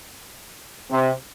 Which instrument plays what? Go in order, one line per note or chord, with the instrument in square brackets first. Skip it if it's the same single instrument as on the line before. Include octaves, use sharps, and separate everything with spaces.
[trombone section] C3